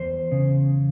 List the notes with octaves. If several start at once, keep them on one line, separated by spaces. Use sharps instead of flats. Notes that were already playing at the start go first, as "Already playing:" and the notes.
Already playing: E2 C5
C#3